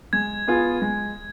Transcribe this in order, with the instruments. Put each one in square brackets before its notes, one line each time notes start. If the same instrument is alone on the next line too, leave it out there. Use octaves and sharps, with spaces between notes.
[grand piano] G#3 [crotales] G#6
[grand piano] B3 F4 G#4
G#3